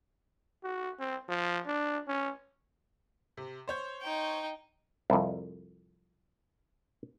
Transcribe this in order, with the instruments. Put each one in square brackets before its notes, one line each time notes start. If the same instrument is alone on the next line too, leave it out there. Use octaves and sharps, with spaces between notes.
[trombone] F#4
C4
F3
D4
C#4
[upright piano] C3
C5 C#5 G6
[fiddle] D#4 G5
[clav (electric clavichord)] C2 F2